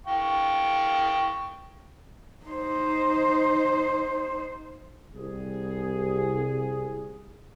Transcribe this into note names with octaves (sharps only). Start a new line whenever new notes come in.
F5 G5 C#6
D#4 C5
C2 G#4